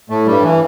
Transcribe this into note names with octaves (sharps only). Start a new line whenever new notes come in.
A2 A3
G2 G3
E3